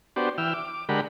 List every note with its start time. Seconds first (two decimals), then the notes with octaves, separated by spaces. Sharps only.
0.16 B3 D4 F#4 G4 C5
0.38 E3 G5 E6 F6
0.54 D6
0.89 D3 G#3 G4 A#4 F#5 B5